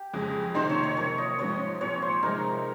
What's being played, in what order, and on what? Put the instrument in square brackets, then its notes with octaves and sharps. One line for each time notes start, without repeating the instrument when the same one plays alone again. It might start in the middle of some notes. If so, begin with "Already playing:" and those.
Already playing: [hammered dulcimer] G4
[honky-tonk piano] F2 C#3 G#3
[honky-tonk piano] C3 D#3 A#3 D#4 [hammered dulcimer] C5
[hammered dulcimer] C#5
C#5
[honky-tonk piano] C3 F3 A#3 [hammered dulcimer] C#5
[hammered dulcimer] D#5
[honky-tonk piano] G#2 F3 C4 [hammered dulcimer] C#5
[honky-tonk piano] A#2 F3 C4 [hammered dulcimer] C#5
[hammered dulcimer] C5
[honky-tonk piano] C3 F3 G#3 D#4 [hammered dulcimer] A#4